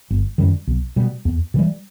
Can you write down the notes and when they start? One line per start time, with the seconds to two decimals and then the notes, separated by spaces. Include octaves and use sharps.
0.10 G1
0.38 F#2 D#3 G3
0.67 B1
0.96 B2 G3
1.25 E2
1.54 C3 E3 G3